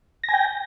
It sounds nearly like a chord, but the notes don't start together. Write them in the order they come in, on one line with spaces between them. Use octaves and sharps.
A#6 G#5 G5